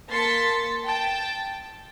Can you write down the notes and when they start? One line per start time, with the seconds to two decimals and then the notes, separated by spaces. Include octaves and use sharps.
0.11 A#3 A5 C6 A6 B6 C#7
0.87 G5 A5